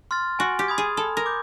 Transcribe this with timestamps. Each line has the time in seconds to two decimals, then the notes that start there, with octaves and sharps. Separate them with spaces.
0.11 C6 F6 A6
0.39 F#4 G#5
0.59 G4
0.68 B5 D#6 G#6
0.78 G#4
0.97 A4 B5
1.17 A#4
1.26 D6 G6